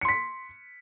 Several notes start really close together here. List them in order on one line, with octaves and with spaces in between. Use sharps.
C#7 C6 B6